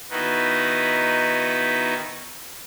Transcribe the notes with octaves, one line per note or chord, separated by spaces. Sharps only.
D#3 B3 D#4 E4 F#4 B4